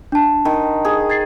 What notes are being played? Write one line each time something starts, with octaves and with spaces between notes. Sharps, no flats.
D4 A5
D#3
G#4
G#6 A6 C7